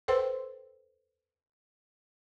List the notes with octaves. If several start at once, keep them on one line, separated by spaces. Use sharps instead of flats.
A4 B4 C5 G5 C6 E6